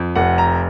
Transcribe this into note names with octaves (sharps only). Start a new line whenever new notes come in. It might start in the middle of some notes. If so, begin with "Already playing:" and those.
Already playing: F2
F1 F#5
A#5